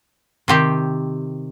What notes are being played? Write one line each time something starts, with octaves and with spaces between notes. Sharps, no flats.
C3 D#3 C4 G4